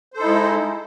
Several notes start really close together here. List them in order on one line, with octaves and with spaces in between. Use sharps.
C5 A4 D#4 E4 G#3